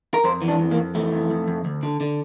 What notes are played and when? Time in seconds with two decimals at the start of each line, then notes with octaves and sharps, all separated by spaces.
0.14 A#4
0.24 F2 C5
0.42 E3
0.48 D4
0.59 F2
0.71 A#3
0.77 F2
0.95 E3 A3
1.12 F2
1.30 F2
1.48 F2
1.65 D2
1.83 D3
2.00 D3